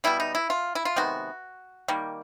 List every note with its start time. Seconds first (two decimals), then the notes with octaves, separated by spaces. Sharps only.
0.04 B2 G3 B3 E4
0.20 D#4
0.35 E4
0.50 F4
0.75 E4
0.85 F4
0.96 C3 D#3 G#3 B3 F#4
1.88 D#3 G3 A#3